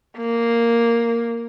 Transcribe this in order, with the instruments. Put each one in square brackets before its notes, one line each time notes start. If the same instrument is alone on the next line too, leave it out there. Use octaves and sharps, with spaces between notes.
[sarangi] A#3